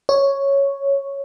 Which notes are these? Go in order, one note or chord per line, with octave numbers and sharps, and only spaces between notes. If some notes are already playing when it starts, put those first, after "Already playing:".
C#5